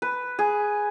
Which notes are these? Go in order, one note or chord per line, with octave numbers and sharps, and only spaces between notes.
B4
G#4